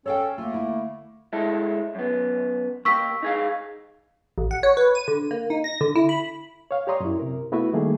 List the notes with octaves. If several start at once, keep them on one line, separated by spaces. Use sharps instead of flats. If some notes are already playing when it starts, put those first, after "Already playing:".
C#4 A4 C#5 F5 G5
D3 A3 A#3 F4
E4
G#3 E4 A4
F#2 B3
A#3 G4 C#6 E6 B6
D#4 G#4 F5
A1
F#5
C#5
B4
D#7
D3
A#3
D#4
A#6
D3
E4
B5
C#5 F5
G4 C#5 D5 A#5 C6 D#6
F#2 E4
C3 A#4
A3 B3 E4 F#4 B4 E5
D#3 G3 A3 A#3 G#4